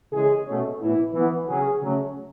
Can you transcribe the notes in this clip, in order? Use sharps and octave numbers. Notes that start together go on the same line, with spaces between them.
C#3 E3 G#3 C#4 G#4
B2 A3 C#4
A2 E3 B3 E4
E3 B3
C#3 F#3 C#4 G#4
C#3 F#3 A3 C#4